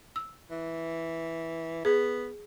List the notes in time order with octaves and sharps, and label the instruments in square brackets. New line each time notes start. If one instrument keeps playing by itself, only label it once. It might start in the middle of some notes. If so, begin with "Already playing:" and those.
[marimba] E6
[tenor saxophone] E3
[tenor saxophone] B3 [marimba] G#4